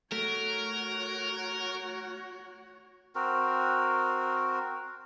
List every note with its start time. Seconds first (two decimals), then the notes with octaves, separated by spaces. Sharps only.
0.12 A3 F#4 A#4 C#5
3.15 C4 F#4 A#4